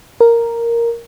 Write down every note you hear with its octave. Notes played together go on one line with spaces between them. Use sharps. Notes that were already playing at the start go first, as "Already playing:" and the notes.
A#4